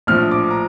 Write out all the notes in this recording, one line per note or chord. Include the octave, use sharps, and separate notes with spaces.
A#1 A2 F3 F6
D6
A#5